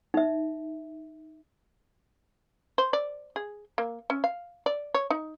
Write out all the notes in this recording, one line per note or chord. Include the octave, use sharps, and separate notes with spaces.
D#4 E5
C5
D5
G#4
A#3
C#4
F5
D5
C#5
D#4